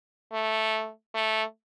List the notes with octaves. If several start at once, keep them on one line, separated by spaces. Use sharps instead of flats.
A3
A3